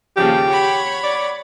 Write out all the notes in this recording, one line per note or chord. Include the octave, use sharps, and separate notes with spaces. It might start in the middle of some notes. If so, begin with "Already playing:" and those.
D#2 C#3 F3 G4
C#5 F#5 B5
D5